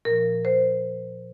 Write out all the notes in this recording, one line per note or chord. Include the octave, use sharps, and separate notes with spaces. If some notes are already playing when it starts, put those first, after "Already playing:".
A#2 F3 A#4
C5